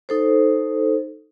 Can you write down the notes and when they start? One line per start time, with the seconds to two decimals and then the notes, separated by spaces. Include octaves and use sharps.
0.09 D#4 A4 C5